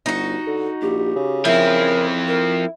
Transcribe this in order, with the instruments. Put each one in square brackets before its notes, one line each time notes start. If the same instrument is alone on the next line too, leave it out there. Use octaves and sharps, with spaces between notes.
[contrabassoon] G1 [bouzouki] D#4 F#4
[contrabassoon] D3
[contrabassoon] A#1 [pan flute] G4
[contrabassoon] C#3
[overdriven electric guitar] F3 C4 [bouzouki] E4 [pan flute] A#4
[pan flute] A#4